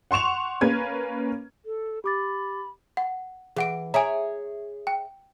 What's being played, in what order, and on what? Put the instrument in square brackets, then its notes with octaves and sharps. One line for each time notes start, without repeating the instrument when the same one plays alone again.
[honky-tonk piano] F#5 C6 C#6 E7 F7
A#3 C#4 B4 G#6
[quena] A4
[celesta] G4 D6 A6 [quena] B5
[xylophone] F#5
[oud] E3 [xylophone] G#4 F#5 D7
[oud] G#4 C#5 E5 [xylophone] G#5 A#5
[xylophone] G5